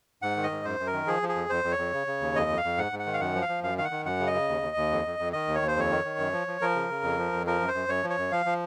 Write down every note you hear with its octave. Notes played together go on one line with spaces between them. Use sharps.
G#2 F#5
D#3
D#5
G#2
F#2 C5
F#2
A#4
D#3
F3 G#4
F3
G#4
F2
F2 C5
F2
C#5
F2
C#3
C#3
D#2
F2 D#5
F2
F5
F2
G#2 F#5
G#2
F#5
D#3
F5
F#2 F#5
F3
F5
F3
F#2 F5
D#3 F5
F#5
D#3
F#2 F#5
C#3
D#5
C#3
D#2
D#2
D#2
F2
F2
F2
D#3 D#5
D#2
C#5
D#2
C5
F2 C#5
D#3
D#3
F#2
F3
F3
F3 A#4
C#3
C#3
F2
F3
F2
F3 A#4
F#2
C5
F#2
F#2 C#5
F3
C#5
F#2
F3 F5
F3